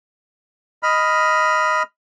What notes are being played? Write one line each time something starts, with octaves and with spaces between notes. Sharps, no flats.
D#5 B5 F6